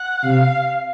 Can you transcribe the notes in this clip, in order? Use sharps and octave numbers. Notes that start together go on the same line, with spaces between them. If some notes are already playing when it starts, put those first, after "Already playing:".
Already playing: F#5
C3 F5